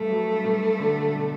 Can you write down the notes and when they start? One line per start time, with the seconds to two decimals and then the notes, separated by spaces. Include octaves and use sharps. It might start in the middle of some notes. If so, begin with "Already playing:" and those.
Already playing: G2 A3
0.09 F#3
0.44 G2
0.80 D3
1.14 B2